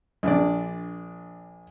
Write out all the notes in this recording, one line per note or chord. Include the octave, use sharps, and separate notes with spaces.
A#1 D4 D5